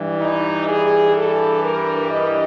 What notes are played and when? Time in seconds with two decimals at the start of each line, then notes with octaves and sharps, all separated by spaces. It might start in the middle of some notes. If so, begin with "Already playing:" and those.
Already playing: G2 E3 G3
0.21 D#4
0.68 G#4
1.15 A4
1.62 A#4
2.11 D#5